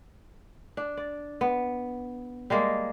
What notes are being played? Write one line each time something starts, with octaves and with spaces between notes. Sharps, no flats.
D4
D5
B3
G3 G#3 A#3